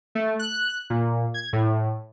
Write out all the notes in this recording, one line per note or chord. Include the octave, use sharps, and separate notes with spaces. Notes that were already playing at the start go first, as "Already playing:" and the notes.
A3
F#6
A#2
G#6
A2